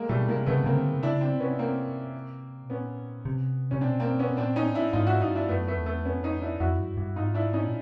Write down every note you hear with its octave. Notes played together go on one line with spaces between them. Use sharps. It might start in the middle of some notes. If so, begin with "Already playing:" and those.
Already playing: G#3 A#3
B2 G3 A3
C3 G#3 A#3
C#3 A3 B3
C3
C#3 A#3 C4
D3
C3
C#3 D4 E4
C4 D4
C3
B3 C#4
A#3 C4
B2
A#2 B3 C#4
C3
C3 C#4
B2 C4 D4
A#3 C4
B3 C#4
A#2 C4 D4
C#4 D#4
A2
D4 E4
G#2 D#4 F4
E4 F#4
G2 D#4 F4
D4 E4
F#2 A3 B3
A3 B3
E2
A3 B3
F2 B3 C#4
C#4 D#4
D4 E4
F2 E4 F#4
G2
G2
G#2 D#4 F4
D4 E4
C#4 D#4
A#2